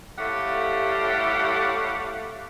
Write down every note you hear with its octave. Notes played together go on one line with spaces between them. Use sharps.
A2 G3 A3 G4 F5 F#5